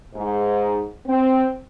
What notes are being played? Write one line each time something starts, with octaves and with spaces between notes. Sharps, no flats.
G#2
C4